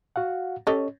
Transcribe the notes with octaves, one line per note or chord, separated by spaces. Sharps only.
F#4 F5 F#5
C#4 G4 A4 C#5 D#5